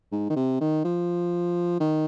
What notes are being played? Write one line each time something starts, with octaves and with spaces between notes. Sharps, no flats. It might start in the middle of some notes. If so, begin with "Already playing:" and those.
G#2
D#3
C3
D#3
F3
D#3